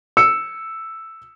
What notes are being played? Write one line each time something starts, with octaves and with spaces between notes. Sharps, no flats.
E6 C#7